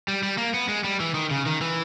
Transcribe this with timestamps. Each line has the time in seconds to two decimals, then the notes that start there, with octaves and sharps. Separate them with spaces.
0.08 G3
0.23 G3
0.38 A#3
0.54 B3
0.68 G#3
0.84 G3
1.00 E3
1.15 D#3
1.31 C#3
1.46 D#3
1.61 E3